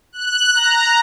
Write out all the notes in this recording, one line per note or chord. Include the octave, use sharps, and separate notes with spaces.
F#6
A#5